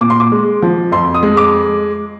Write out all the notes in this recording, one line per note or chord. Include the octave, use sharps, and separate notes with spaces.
A#2 D6
C6
D6
G#3
F3
F2 C6
D#6
G#3
D6